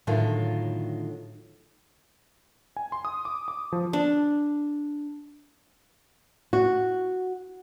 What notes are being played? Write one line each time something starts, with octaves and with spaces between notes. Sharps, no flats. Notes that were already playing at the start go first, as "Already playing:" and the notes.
A2 D3 D#3 F#3 F4
G#5
C6
D#6
D6
D6
F3
D4
F#4